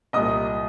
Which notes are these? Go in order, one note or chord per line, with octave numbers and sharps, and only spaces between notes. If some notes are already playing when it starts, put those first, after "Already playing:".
C2 A#2 G3 D#5 D#6